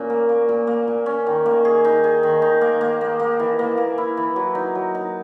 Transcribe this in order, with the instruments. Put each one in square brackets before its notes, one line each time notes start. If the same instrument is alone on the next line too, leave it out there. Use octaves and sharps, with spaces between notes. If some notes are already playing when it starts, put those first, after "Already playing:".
Already playing: [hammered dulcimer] A#2 C#4
A#3
A#3
A#2
A#3
A#2
C#4
D#3
A#3
G#4
D#4
G#4
D#3
D#4
A#3
A#3
A#3
A#3
E3
A#3
A#3
E4
E3
F#3
D#4
F#3
D#4